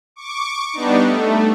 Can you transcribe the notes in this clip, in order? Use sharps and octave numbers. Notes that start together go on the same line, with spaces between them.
C#6 D6
G3 B3 D4 D#4
A3